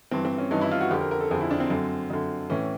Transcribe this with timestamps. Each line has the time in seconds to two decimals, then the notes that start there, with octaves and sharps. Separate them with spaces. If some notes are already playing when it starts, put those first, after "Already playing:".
0.11 G2 E3 C4
0.25 C4
0.38 C#4
0.51 G2 E3 D#4
0.61 E4
0.71 F4
0.81 F#4
0.91 F2 D3 G4
1.01 A#4
1.11 A#4
1.21 A4
1.31 F2 D3 G#4
1.41 E4
1.51 D4
1.60 C4
1.70 F#2 D3
2.10 F#2 D3
2.50 A2 E3 C#4